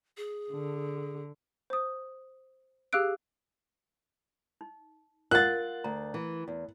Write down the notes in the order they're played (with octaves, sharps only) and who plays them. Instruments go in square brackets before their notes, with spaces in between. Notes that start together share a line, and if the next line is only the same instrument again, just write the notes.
[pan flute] G#4
[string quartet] D3
[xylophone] C5 D#6
G4 G#4 F5 E6 F#6 D7
[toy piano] D#4
[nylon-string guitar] F4 [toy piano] A#4 F#5 [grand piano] F#6 A6
[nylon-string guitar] D2 [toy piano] A#5
[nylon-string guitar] E3
E2